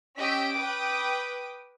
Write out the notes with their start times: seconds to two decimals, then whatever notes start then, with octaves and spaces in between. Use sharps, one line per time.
0.16 C#4 G4 D#5 E6 B6 D7
0.53 B4 G5 D6 D#6